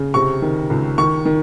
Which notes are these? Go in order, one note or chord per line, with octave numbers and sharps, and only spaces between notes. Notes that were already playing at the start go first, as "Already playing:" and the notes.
Already playing: C#3
C3 C#6
D#3
C#2
D#3 C#6
D#3